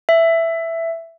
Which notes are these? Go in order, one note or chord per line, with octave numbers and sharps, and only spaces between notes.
E5